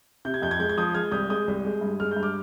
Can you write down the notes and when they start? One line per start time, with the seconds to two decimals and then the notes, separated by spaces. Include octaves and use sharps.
0.25 C3 G6
0.34 G#6
0.42 F2 G6
0.51 G#6
0.59 G#3 G6
0.69 G#6
0.77 F3 D#6 G6
0.94 G#3 F6 G#6
1.11 C2 D#6 G6
1.29 G#3 D#6 G6
1.48 C2
1.65 G#3
1.81 G2
2.00 G#3 F6
2.11 G2 G6
2.23 D6 F6